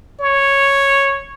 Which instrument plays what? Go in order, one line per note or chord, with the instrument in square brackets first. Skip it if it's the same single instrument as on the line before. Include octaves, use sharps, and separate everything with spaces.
[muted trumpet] C#5